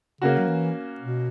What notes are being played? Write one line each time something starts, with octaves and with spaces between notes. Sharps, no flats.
C#3 A#3 C#4 F#4
F#3
E3
B2